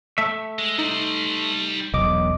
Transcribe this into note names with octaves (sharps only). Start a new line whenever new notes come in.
A3 E5
G#3
G3 D#4 C5
E1 B1 D#5 D6